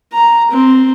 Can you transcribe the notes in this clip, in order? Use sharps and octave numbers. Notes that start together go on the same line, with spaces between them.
A#5
C4